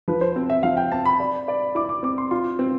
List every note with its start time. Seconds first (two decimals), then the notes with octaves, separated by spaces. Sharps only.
0.08 F3 B4
0.21 C5
0.36 C4
0.50 E5
0.63 F3 F5
0.77 G5
0.92 C4 A5
1.05 B5
1.20 D5
1.48 D5
1.75 E4 D6
1.89 D6
2.03 C4 D6
2.18 C6
2.31 F4 C6
2.59 C4